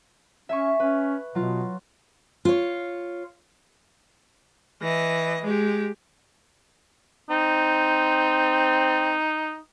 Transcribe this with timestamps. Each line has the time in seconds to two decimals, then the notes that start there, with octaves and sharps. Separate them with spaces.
0.49 C#4 E5 G#5 C#6
0.80 C#4 B4
1.35 B2 F#3 F4
2.45 F4 C#5
4.82 E3 D#5
5.44 G#3 G4
7.30 C4 D#4